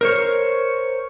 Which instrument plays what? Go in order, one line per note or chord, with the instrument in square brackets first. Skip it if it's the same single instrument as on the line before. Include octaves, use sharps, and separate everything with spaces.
[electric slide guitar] A#4 C5 C#5